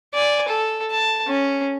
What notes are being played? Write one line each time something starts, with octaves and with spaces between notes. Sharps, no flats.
D5 G#5
A4
A5
C#4